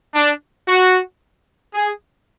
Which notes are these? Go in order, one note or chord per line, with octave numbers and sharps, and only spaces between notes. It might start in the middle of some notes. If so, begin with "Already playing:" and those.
D4
F#4
G#4